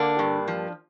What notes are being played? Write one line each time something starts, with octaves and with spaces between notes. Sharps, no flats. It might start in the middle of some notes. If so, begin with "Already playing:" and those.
Already playing: D3 A#3 D4
G2
F3